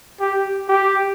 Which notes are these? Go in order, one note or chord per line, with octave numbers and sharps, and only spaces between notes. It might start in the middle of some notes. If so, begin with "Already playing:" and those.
G4
G4